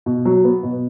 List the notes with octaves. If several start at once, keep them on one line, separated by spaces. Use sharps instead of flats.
B2
F#3
B3
B2